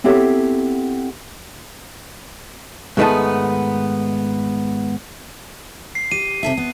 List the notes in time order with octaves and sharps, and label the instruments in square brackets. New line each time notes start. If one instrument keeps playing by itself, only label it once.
[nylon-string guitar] B3 C4 E4 G4 A4 C#5
[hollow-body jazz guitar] G#2 D#3 A3 B3 D#4 A5
[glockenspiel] C7
[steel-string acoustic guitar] G4 [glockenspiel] D#7
[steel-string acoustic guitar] C3 A4 E5
B3